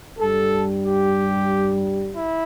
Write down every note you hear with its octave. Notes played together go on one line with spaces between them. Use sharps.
G2 G3 A4
G4
E4